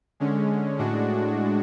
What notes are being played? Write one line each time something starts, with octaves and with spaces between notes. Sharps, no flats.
D3 G#3 C#4
A2 G#3 D4 F#4